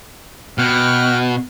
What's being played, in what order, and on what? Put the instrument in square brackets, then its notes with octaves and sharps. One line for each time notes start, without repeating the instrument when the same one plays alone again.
[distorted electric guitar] B2 [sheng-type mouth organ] G5 F6 F#6